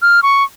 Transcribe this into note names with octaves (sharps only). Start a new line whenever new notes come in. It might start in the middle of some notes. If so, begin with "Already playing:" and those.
F6
C#6